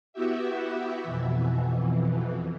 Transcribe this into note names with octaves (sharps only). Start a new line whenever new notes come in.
B3 E4 F#4 G4 E5
F2 B2 E3